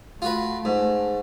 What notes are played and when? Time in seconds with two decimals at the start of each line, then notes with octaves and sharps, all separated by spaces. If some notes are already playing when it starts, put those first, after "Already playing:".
0.22 A3 F4 F#4 B4
0.65 G#2